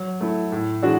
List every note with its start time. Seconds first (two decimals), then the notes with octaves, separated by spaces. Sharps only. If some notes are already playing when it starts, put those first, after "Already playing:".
Already playing: F#3
0.21 A3 E4
0.52 A2
0.83 E3 G#3 D4 F#4